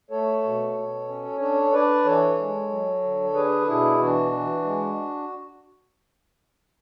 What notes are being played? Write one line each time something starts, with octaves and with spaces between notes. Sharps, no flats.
A3 A4 C#5
B2
B2
C#4
D4 A4 C#5
D4 B4 D5
E3 A4 C#5
G#3
F#3
D3
D4 G#4 B4
A4
B2 E4 G#4
E3 D4 F#4
E3
G#3